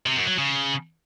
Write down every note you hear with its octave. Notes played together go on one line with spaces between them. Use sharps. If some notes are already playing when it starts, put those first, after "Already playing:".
C3
F#2
F#3
C#3